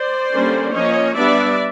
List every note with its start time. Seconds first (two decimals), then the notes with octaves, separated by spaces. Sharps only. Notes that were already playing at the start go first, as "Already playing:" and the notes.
Already playing: C5 D5
0.32 D3 G3 A#3 C#4
0.72 F3 A#3 C#4 C#5 D#5
1.14 G3 B3 D4 D5 E5